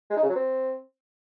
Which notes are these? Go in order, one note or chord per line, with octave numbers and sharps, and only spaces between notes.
G#3
D#4
C#3
F#3
C4